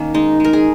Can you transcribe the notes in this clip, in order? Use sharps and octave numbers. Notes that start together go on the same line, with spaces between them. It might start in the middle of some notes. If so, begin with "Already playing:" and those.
Already playing: D#3 A#3 C#4
G#3 D#4
G#3 A#4
G#4